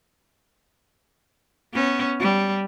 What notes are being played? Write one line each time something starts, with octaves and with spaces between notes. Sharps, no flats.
B3 C#4
G3